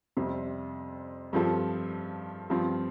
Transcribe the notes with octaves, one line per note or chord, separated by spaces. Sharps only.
F2 C3 G3
G2 F3 C4 F4 A4
G2 F3 C4 F4